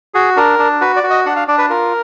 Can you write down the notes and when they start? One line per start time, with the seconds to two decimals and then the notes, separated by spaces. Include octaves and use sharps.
0.14 F#4 G#4
0.36 D4 A#4
0.59 D4
0.81 F#4 B4
0.96 D5
1.03 F#4
1.10 D#5
1.26 D4 F#5
1.36 F5
1.48 D4 D5
1.58 B4
1.70 F4 A#4